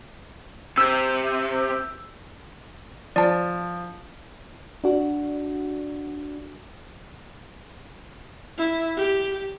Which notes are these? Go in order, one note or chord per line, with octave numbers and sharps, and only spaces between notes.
C3 E6 G6
F3 D5 A5
D4 F#4
E4
G4